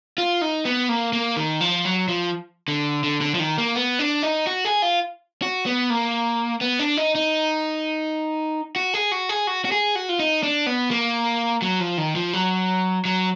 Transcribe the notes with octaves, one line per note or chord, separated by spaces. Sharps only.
F4
D#4
B3
A#3
A#3
D#3
F3
F#3
F3
D3
D3
D3
F3
D#3
A#3
B3
D4
D#4
F#4
G#4
F4
F#4
B3
A#3
B3
D4
D#4
D#4
F#4
G#4
F#4
G#4
F#4
F#4
G#4
F#4
F4
D#4
D4
B3
A#3
F#3
F3
D#3
F3
F#3
F#3